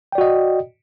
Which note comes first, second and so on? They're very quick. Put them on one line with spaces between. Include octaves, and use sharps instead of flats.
G5 D5 F#4 D#5